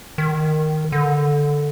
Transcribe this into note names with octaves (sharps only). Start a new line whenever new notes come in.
D#3
D3